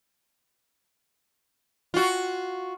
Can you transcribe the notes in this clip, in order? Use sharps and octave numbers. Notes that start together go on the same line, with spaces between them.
F4 F#4